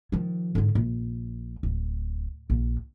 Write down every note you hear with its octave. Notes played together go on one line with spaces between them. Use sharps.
D#3 F3
G#2 D3
A#1
D1
A#1